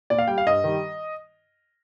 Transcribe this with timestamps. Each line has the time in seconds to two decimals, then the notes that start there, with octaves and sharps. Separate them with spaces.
0.10 A#2 D5
0.18 F5
0.28 G3 G5
0.38 F5
0.46 G2 D#5
0.64 D#3 G3